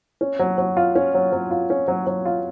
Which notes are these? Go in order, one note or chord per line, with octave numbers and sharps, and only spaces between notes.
C#4
F#3
F#3
F4
C#4
F#3
F#3
F4
C#4
F#3
F#3
F4